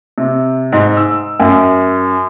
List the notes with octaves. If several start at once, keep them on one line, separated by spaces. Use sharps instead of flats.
C3
G#2
E6
F#2